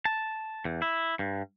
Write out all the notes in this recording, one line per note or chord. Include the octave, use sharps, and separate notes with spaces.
A5
E2
E4
G2